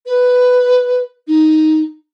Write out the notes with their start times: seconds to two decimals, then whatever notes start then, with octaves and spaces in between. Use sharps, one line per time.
0.06 B4
1.27 D#4